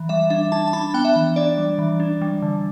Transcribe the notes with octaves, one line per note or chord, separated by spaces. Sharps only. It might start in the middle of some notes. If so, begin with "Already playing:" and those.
Already playing: E3
G3 E5
D4 E5
D4 A5
A5
D4 B5
B3 G5
E5
E3
D4 D5
G3
E3
D4
G3
D3